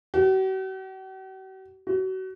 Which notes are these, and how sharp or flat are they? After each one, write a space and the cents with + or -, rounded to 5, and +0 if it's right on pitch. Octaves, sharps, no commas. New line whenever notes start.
F#4 +45
F#4 +30